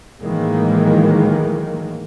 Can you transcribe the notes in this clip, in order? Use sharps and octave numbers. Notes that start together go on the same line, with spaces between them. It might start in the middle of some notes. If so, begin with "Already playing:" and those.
A2 D#3 E3 F#3 G#3 A#3